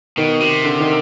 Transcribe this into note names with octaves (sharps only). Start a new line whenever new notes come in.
B2 D#3
C3
D3
D#3